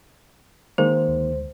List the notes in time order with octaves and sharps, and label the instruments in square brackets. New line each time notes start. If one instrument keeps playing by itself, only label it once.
[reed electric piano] D#3 G#3 A#3 [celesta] C5
[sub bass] D2